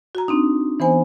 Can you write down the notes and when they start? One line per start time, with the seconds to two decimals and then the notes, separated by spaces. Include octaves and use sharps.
0.15 F#4 A#5
0.28 C4 D4 D#4
0.80 E3 B3 C5 G#5